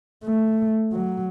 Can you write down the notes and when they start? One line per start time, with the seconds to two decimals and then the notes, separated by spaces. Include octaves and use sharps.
0.25 A3
0.93 F#3